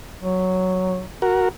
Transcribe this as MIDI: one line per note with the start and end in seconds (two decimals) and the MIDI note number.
0.21 1.02 54
1.22 1.49 66
1.22 1.49 70